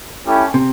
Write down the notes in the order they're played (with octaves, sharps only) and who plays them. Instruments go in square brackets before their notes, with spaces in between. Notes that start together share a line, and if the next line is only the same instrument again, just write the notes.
[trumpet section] A3 C#4 E4 G4
[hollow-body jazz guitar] C3